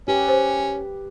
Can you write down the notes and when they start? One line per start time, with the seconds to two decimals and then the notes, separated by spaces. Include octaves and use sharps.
0.08 C#4 G4 B4
0.28 C5